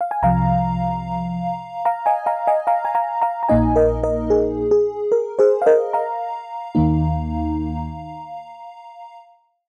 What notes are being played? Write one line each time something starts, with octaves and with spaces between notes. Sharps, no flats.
F5
G#5
C2 C3 F3 F5 A#5
F5 A#5
D#5 G#5
F5 A#5
D#5 G#5
F5 A#5
G#5
F5 A#5
F5 A#5
A#5
A#1 A#2 A#3 D#4 D#5 G#5
A#4 D#5
A#4 D#5
G#4
G#4
A#4
G#4 C5
F5
A#4 D#5
F5 A#5
D#2 D#3 A#3 D#4